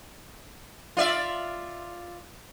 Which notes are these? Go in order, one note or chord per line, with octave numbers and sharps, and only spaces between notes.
F4 D5 E5